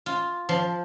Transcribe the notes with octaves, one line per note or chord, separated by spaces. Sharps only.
F4
F3